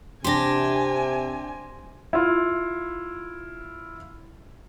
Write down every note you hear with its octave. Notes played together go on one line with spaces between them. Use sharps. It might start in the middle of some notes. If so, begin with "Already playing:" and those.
C3 D4 G4 G#5 C6 A#6
E4 F4